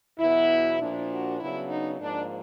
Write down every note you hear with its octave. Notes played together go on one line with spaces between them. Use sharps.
E2 B2 F#3 B3 E4
A#2 F3 A#3 D4
F#4
C#3 F#3 B3 D4 E4
D#4
G#2 F3 A#3 D4